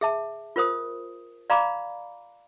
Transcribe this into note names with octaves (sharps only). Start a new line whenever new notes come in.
G#4 E5 A5
F4 A#4 C5 D#6
D5 F5 A#5 B5 D6